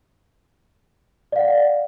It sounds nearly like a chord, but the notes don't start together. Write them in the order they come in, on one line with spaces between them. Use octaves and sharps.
D5 F5 F#5